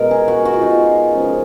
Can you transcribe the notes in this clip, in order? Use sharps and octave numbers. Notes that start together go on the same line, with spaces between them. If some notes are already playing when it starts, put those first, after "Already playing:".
Already playing: B2 G#3 A#4
G#4
F#4
F#4
F4
D#4
F4
C#3 F3 G#3